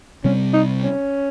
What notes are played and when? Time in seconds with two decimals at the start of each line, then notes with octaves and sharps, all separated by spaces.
0.24 C3 G3 C4 C#4
0.53 D#4
0.83 C#4